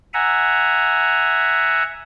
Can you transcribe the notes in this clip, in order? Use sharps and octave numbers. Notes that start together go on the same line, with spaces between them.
E5 F#5 G#5 A#5